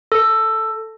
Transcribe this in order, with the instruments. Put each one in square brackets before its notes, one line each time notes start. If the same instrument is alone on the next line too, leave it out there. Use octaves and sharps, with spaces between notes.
[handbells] A4